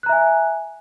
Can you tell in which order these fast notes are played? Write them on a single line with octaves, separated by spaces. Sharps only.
F#6 A#5 E5 G#5